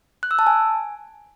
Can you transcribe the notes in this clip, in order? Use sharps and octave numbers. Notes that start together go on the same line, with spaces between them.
F#6
E6
A5
G#5